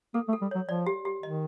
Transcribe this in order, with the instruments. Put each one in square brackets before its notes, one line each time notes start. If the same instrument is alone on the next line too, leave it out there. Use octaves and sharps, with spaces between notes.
[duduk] A#3 [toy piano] A4
[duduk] A3
[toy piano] A4
[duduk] G3
[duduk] F#3 [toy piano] C#5
[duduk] F3 [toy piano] D5
[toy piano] G4
G4
[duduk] D#3 [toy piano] D#5